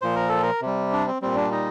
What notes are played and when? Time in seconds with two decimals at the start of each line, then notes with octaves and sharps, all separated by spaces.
0.02 A#2 F3 C5
0.16 A#4
0.29 A4
0.43 A#4
0.61 C3 G3
0.92 D4
1.07 C4
1.22 A#2 G3 C4
1.36 D4
1.52 D#4